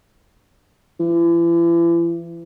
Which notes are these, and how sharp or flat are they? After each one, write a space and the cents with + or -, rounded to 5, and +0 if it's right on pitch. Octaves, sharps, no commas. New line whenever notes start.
E3 +40